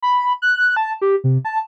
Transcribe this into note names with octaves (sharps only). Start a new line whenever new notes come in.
B5
F#6
A5
G4
C3
A5